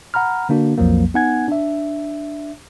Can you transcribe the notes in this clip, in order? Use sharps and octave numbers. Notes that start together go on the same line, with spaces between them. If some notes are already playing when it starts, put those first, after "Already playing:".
F#5 A#5 B5 F6
D3 A#3 D4 F#4
B1 F2 F3 F#3 A#3
B3 D#4 F#5 G#5 G#6
D4 E5